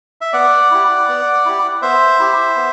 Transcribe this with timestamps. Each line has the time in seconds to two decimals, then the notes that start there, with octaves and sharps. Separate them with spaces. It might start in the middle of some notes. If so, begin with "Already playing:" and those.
0.21 E5
0.33 B3 D5 F#5
0.71 E4 G4
1.08 B3
1.46 E4 G4
1.82 B3 C5 E5
2.20 E4 G4
2.56 B3